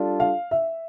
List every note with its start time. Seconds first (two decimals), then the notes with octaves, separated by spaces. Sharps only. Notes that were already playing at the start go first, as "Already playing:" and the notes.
Already playing: G3 D4 F4 A4
0.20 F5
0.51 E5